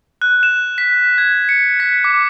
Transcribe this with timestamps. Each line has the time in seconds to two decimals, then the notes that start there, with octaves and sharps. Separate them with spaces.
0.22 F#6
0.43 E7
0.78 B6
1.18 G#6
1.49 C#7
1.80 B6
2.04 D6